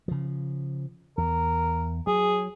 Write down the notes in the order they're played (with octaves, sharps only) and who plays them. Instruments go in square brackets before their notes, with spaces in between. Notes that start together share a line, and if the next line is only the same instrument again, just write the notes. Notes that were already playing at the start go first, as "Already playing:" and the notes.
[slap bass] C#3 F3
[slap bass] E2 [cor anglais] A#4
[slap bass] F#3 [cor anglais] G#4